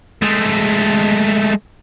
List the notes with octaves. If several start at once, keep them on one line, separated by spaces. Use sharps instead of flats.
G#3 A3